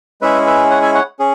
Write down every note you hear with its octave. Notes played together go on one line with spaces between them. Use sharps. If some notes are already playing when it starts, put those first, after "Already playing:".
G#3 C#4 E4 G#4 B4 E5
B4 E5
C#5 F#5
E5 G#5
C#5 F#5
C#4 G#4